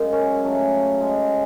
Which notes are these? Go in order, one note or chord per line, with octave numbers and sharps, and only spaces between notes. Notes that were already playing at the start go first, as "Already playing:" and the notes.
Already playing: F#2 C#3 G#3
C#4
C#3 F#3 A3
C#3 G#3